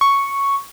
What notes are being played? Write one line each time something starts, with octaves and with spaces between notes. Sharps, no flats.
C#6